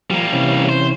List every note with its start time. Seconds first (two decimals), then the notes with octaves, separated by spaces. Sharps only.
0.11 F3 G3 A#3
0.33 C3 E3 C#4
0.69 C5